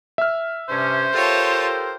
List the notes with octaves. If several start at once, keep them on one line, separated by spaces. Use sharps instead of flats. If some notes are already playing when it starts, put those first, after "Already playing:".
E5 F6
G2 C3 C#4 C5
F4 G4 A4 A#4 C#5 A5